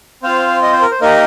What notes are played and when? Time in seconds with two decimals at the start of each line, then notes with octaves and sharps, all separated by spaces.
0.23 C4 F4 C5 F5
0.62 D#5
0.72 C5
0.81 A#4
0.91 C5
1.01 A#3 D#4 G4 A#4 D#5